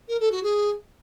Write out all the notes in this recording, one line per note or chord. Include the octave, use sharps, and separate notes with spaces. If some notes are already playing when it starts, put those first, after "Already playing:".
A#4
A4
F#4
G#4